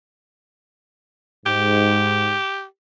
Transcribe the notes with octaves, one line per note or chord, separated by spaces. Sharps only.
G#2 G4